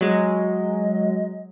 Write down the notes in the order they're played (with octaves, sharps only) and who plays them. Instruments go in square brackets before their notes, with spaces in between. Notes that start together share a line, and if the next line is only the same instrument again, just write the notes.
[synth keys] F#3 G#3 [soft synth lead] D#5